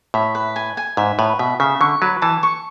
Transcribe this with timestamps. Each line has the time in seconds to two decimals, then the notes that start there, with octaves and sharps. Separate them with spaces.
0.14 A2 E5
0.35 B4
0.56 G#5
0.77 G#5
0.97 G#2 E5
1.19 A2 B4
1.39 B2 E5
1.60 C#3 E5
1.81 D3 C#6
2.02 F#3 B4
2.22 E3 A5
2.43 C#6